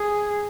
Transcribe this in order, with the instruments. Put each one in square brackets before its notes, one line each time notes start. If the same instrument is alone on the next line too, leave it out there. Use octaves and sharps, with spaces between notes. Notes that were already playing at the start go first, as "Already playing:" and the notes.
Already playing: [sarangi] G#4